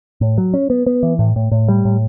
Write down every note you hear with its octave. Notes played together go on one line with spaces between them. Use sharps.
A2
F#3
C#4
B3
B3
E3
A2
A2
A2
G3
A2